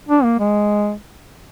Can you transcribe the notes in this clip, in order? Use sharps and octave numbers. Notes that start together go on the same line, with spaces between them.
D4
A#3
G#3